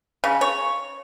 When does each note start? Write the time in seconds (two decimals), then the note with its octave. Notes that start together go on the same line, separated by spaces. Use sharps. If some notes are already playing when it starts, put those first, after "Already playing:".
0.24 C#3
0.41 C#5